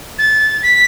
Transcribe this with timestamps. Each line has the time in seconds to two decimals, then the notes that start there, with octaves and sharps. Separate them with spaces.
0.19 A6
0.63 B6